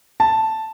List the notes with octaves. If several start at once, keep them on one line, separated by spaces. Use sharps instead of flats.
A5